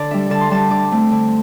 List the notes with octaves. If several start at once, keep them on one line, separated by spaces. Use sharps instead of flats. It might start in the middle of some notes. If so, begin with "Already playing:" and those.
Already playing: D3 D5
G3 D4 E5
D3 A5
C6
G3 D4 A5
D3 D6
A3 C4
D3